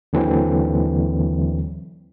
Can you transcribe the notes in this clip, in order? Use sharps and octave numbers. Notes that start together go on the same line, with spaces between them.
D#2 D3 E3 F#3 C4